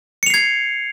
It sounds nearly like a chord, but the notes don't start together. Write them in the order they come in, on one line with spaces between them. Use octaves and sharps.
C#7 F7 C7 G#6